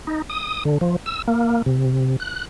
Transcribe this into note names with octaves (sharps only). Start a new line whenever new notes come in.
D#4
D#6
D3
F3
E6
A#3
C3
F#6